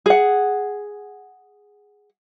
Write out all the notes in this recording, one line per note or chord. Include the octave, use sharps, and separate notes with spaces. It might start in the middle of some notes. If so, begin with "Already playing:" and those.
G#4 F#5